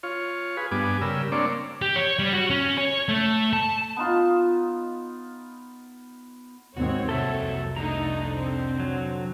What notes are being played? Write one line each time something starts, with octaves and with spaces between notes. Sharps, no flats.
F4 C#5
G#4 B4
G2 B3 G#5 D6
C#3 G3 A#4 E6
A#3 C4 D4 C#5 D5
G4
C#5
G3
F#4
C#4
C#5
A3
A5
B3 D#4 F4
D#2 G#2 C4 F#4 C#5
C2 F2 F#3 A#3 F#4 A4 E5
D3 A3 D#4 A#5
C4
F#3